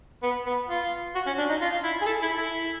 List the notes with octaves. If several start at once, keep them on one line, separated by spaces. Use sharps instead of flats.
B3
B3
F4
F#4
C#4
D4
D#4
F4
E4
G#4
A4
E4
E4